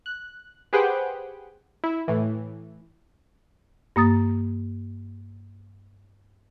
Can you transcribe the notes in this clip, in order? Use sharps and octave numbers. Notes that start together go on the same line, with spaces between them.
F#6
G4 G#4 B4 C5 F#5 G5
E4
A2 E3
G2 A#3 D#6 A6